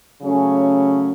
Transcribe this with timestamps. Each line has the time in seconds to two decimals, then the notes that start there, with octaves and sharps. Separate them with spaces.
0.22 C#3 F#3 A3 C#4